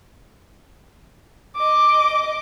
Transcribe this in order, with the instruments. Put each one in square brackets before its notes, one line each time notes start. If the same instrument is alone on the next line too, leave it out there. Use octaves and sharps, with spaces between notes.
[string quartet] D#5 D6